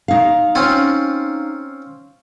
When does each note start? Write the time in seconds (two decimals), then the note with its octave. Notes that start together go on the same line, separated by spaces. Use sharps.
0.08 D#4 F5
0.55 C4 C#4 F4